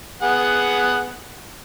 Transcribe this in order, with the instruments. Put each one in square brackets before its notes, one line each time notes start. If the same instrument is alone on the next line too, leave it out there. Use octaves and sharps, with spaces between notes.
[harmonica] B3 G#4 F#5